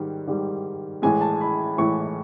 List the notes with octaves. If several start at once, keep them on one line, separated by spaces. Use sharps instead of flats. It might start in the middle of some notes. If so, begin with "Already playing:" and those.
Already playing: G#2 D#3 G3
G#2 D#3 G3
A2 E3 G#3 G#5
A5
B5
A2 E3 G#3 C#6